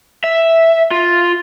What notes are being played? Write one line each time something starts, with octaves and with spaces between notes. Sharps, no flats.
E5
F4